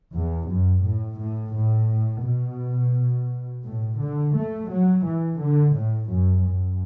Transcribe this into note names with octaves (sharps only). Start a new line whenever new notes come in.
E2
F#2
A2
A2
A2
B2
A2
D3
A3
F#3
E3
D3
A2
F#2
F#2